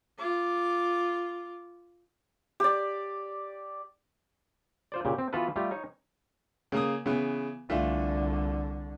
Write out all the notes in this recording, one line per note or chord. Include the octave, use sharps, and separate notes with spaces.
F4 D6
G4 D5
F4 C5 D5
A#2 C#3 G4
C4
E3 B3 F4 F#4 A4 B4
G3 A3 F4 G4
D#4 C#5
C#3 A#3 D#6
C#3 E3 B3
C2 D3 E3 A3 F4